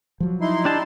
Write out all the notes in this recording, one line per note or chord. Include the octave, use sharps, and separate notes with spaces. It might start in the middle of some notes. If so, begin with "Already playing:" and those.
F3 F#3
D#4 E4 C6
D4 G4 A5